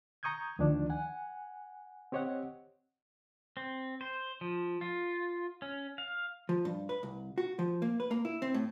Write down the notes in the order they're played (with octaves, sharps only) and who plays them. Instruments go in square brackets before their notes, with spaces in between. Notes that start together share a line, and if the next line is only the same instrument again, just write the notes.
[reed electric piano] A#5 C#6 D#6 G6 G#6
D2 D#3 F3 D4 D5
F#5 G#5
C4 G4 C#5 D#5 F#5
[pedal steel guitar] C4
C5
F3
F4
C#4
F5
[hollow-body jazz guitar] F3
G2
B4
C2
F#4
F3
A#3
B4
A#3
E4
C4
A2